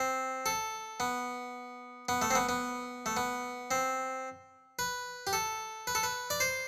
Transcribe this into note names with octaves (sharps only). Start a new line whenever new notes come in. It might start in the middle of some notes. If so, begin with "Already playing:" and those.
Already playing: C4
A4
B3
B3
A3
C4
B3
B3
A3
B3
C4
B4
G4
A4
B4
A4
B4
D5
C5